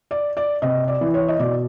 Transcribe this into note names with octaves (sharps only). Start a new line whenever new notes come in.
D5
D5
C3 D#5
D5
E3
C#5
D#5
B2 D5